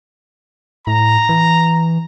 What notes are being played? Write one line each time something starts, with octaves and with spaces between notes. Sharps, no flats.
A2 A#5
E3